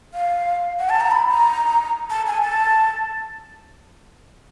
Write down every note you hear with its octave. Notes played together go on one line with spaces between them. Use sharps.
F5
F#5
A5
A#5
B5
A#5
A5
G#5
A5